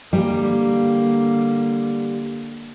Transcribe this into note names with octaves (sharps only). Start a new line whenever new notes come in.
D3 G3 A#3